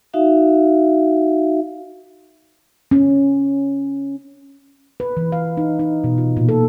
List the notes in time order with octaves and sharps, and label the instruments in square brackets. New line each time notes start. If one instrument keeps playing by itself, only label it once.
[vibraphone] D#4 F#4 E5 F5
[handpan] C#4
B4
E3
F5
D#4
D#4
B2
F4
A#2
A4